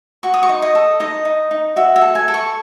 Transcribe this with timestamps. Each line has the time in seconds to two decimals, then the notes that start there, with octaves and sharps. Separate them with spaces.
0.23 F#4 C#6
0.34 D#6
0.43 C#6
0.49 D#4
0.62 D#5
0.75 A4
1.00 D#4 D#5
1.25 D#4
1.51 D#4
1.76 F#4 E5
1.96 E5
2.02 A4
2.15 G#5
2.28 A4
2.34 C#6